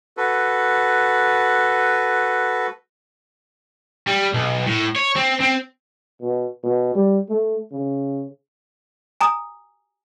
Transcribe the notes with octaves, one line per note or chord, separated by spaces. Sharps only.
F#4 A4 B4
G3
B1
A2
C#5
C4
C4
B2
B2
G3
A3
C#3
G#5 A#5 D#6